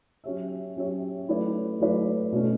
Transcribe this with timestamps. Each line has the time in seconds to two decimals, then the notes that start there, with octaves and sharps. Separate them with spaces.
0.24 F#3 C#4 G4 C#5 E5
0.76 F#3 C#4 G4 C#5 E5
1.28 F#3 A3 E4 B4 D5
1.80 F#3 A3 E4 B4 D5
2.32 B2 A3 C#4